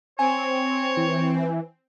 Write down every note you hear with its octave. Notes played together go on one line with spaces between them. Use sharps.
C4 C#5 G#5
E3